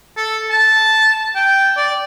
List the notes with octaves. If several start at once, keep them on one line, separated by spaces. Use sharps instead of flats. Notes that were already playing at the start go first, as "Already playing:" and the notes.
A4
A5
G5
D5